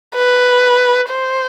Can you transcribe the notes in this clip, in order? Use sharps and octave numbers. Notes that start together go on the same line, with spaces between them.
B4
C5